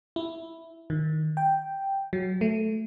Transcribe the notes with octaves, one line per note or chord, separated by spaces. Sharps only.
E4
D#3
G5
F#3
A3